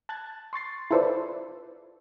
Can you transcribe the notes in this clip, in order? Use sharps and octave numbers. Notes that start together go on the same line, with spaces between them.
A5 F#6 G#6 A6
C6 C#6 A6 C7
E4 F4 A4 B4 C5 D5